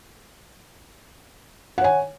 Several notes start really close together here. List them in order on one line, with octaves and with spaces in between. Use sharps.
F#5 C#5 G#5